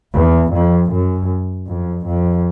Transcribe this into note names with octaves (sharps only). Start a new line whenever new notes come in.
E2
F2
F#2
F2
F2